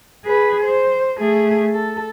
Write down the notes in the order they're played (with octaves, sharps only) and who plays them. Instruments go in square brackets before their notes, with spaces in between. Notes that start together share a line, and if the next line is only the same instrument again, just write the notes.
[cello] G#4 B4
C5
A3 G#4
A4